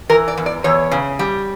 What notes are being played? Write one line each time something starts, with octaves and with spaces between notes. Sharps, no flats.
E3 A#4
D5
E2
D5
E2 C#5
C#3
G3